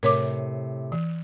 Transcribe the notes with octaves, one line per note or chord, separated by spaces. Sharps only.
A2 C3 A#4 C#5 D6
E3